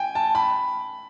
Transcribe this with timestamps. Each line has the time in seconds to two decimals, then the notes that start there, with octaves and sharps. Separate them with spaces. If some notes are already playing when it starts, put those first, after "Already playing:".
Already playing: G5 G#5
0.15 A5
0.35 B5